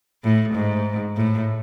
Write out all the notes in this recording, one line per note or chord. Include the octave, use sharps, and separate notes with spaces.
A2
G#2
A2